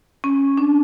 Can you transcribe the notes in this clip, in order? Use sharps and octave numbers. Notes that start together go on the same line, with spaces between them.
C#4
D4